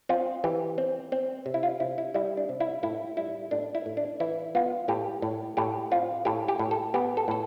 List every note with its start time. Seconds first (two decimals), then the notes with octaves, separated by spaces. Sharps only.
0.09 C4 F4
0.44 E3 G4
0.78 C4
1.12 C4
1.46 C3
1.54 E4
1.63 F4
1.80 C3 E4
1.98 E4
2.14 G3 E4
2.37 D4
2.49 C3
2.60 E4
2.83 A2 E4
3.17 G3 E4
3.51 A2 D4
3.75 E4
3.86 A2
3.97 D4
4.20 E3 E4
4.55 B3 F4
4.88 A2 G4
5.22 A2
5.57 A2 G4
5.91 C4 F4
6.25 A2 G4
6.48 G4
6.59 A2
6.71 A4
6.94 B3 G4
7.17 A4
7.28 A2 A4